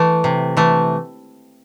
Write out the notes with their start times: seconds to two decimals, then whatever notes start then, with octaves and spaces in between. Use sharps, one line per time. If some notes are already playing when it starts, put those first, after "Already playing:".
Already playing: E3 A3
0.24 C3
0.57 E3 A3